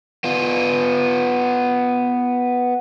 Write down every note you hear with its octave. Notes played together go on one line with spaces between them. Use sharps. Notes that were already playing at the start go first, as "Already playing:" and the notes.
B3 F4